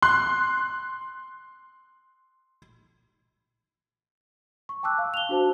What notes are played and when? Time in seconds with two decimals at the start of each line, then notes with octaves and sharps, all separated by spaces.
0.02 C6 F#6
4.69 C#6
4.83 G5 A5 D6 E6 F#6
4.98 F5
5.14 F7 G7
5.29 D4 F#4 C5 A5